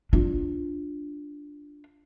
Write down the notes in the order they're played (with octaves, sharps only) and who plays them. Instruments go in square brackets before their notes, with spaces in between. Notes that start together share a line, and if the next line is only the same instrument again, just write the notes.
[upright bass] D4 F4